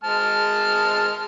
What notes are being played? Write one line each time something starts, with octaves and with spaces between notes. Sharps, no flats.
G#3 A5 F6